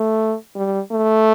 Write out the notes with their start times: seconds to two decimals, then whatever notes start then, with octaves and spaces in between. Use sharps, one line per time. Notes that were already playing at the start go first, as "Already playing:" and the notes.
Already playing: A3
0.56 G3
0.91 A3